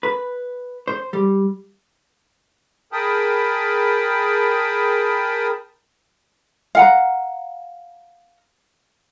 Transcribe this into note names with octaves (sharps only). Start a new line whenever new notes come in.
B4
C5
G3
G#4 A#4 G5 A5 B5 D#6
F5 F#5 A#5